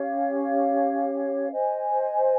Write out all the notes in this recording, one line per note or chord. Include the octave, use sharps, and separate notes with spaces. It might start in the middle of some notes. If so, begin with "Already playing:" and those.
Already playing: C#4 G4 C#5 F5
C5 D#5 G#5